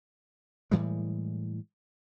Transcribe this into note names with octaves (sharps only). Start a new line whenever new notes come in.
A2 E3 G3 G#3